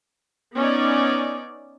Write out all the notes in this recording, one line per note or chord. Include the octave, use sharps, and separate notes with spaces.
B3 C#4 D#4 D5